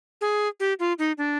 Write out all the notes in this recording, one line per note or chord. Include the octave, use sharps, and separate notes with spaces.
G#4
G4
F4
D#4
D4